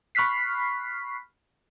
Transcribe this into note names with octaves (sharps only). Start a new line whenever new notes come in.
B5 C#6 F6 F#6 B6 C7